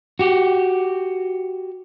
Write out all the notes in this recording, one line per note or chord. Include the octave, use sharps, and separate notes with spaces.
F#4 G4